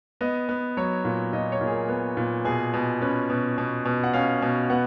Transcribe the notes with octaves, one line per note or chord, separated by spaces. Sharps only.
B3 D#5
B3
F#3 C#5
A#2
A#2 D#5
C#5
A#2
G#4
A#4
B3
A#2
B2 G#4
B2
C#4 B4
B2
B2
B2
F#5
C#4 F5
B2
B3 F#5